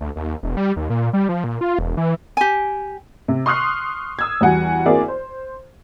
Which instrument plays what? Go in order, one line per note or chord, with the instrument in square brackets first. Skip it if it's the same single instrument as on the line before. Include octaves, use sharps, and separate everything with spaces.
[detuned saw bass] D2
D#2
E1
G3
D#2
A#2
G3
F3
A#2
F4
E1
E3
[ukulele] G4 G#5
[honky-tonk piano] C3
C6 C#6 D#6 F6 F#6 C7
D#6 E6 G#6
E2 G3 F#4 F#5 G#5
A#3 C4 E4 F#4 G#4 D5
C5